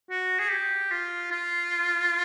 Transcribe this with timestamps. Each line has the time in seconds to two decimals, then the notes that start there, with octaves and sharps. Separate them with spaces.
0.11 F#4
0.40 G#4
0.51 G4
0.91 F4
1.31 F4